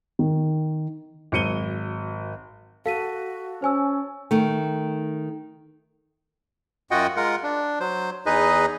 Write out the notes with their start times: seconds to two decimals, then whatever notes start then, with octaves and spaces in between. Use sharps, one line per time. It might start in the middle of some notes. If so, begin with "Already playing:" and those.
0.19 D#3
1.32 G#1 F#3 C#7 D#7 G7
2.86 F#4 A4 F5 B6 D#7
3.62 C#4 C5 G#5 E6
4.31 D#3 A3
6.91 F#2 F4 F#4 D#5 F#5 G5
7.17 G#3 F4 A#4 F#5
7.43 D4
7.80 F#3 C5
8.26 E2 D#4 G#4 B4 D#5